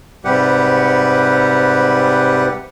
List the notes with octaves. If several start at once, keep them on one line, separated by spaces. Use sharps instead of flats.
G#2 C3 G3 G4 B4 F#5